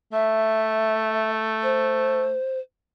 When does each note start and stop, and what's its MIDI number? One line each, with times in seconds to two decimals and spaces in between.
0.13 2.36 57
0.13 1.30 76
1.63 2.59 72